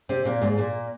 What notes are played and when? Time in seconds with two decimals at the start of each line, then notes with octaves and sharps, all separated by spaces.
0.09 C3 C4
0.25 A#2 A#3
0.42 G#2 G#3
0.57 A#2 A#3